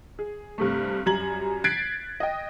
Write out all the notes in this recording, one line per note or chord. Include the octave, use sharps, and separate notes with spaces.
G#4
G2 C3 A3
F#2 G3 A#5 G#6 F#7
F#6 G#6 A6 B6 C7 D7
D#5 G5